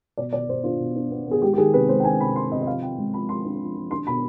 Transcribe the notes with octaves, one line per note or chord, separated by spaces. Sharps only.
B2 D5
B2 D5
B2 C5
D4 F4
B2
D4
B3
B3 G#4
G#3 G4
G4
D#3 G#4
C3 B4
G#3 C5
G5
D4 G#5
C3 B5
D#3 C6
C3 D#5
D#5
F3 F5
F3 G5
G#3
F3 B5
F3 C6
D4
F3
F3
D4 C6
B2 B5